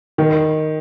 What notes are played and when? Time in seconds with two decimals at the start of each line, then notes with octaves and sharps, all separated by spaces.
0.18 D#3